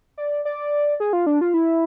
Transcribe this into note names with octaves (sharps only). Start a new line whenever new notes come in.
D5
D5
G#4
F4
D4
F4
E4